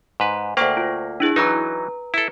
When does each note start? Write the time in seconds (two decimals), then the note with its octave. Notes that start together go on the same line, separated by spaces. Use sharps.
0.20 G#2 B4
0.57 D2 A#3 C5 G5 C#6
0.77 F4
1.20 D4 E4 G#4
1.36 E3 F#3 D#4 B4 A#5
2.14 E4 A4